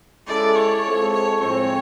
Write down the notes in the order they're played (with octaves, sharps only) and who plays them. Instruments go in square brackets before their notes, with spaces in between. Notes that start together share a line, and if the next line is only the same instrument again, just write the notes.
[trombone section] G#3 C#4 E4 A4 [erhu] D5
[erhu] C#5
[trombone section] G#3 C4 F4 A4
[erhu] C#5
[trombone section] A2 F3 G#3 C4 [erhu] C#5